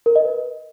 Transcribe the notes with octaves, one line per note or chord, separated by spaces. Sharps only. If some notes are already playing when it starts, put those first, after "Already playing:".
A#4
D#5
B4